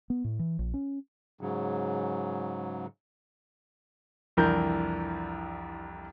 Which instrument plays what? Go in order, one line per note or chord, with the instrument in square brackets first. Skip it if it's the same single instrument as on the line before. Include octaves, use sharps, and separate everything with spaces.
[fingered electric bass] B3
A2
E3
A#1
C#4
[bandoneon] G#2 C#3 F#3
[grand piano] C2 F2 E3 D4 A#4 G6